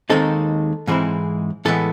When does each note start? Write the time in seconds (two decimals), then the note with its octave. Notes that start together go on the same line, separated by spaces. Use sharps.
0.10 D#2 D#3 G#3 C4 D#4 A4
0.87 G#2 E3 G#3 C4 E4
1.65 A2 E3 G#3 B3 A4